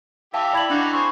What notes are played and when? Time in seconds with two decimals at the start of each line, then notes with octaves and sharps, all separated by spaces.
0.34 E3 G4 E5 F5 G5 A5
0.53 E4 D5 G#6 F#7
0.70 D3 D4 D#4 F#4 D6 F#6
0.93 C4 G#4 C5 C#6